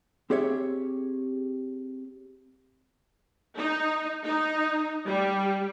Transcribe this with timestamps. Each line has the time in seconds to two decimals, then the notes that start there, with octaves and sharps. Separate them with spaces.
0.30 C4 G4 G#4 C#5 E5
3.56 D#4
4.24 D#4
5.05 G3